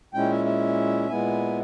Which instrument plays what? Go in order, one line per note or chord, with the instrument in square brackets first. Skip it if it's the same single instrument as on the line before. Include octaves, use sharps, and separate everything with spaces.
[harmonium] A#2 G#3 C#4 E4 G5
E5
E5
A#2 G#3 B3 E4 G#5